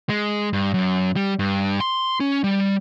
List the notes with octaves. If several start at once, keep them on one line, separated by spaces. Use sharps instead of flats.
G#3
G2
F#2
G3
G2
C6
C#4
G3